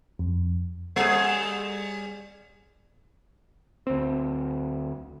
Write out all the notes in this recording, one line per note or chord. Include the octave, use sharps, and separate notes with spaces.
F2
G3 G#4
D2 C4